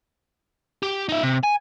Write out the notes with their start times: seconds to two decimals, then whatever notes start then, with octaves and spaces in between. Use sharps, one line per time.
0.83 G4
1.09 D#4 E5
1.23 C3
1.43 G#5